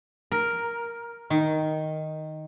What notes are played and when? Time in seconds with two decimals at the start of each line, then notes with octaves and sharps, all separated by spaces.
0.32 A#4
1.30 D#3